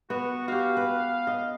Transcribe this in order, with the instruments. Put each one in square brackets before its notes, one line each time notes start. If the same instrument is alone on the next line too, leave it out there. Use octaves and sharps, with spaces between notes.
[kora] B3 [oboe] F#4
[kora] F#4 G4 [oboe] F5
[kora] B4
D#5